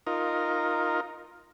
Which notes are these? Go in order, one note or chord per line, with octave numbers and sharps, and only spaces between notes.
D#4 F4 A#4